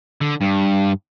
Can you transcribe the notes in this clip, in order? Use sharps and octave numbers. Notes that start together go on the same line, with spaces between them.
D3
G2